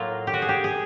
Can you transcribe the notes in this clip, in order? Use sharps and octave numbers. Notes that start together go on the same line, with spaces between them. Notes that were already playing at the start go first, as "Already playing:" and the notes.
Already playing: A2 F#3 A#3 F4
G4
F#4
G#4
G4
G#4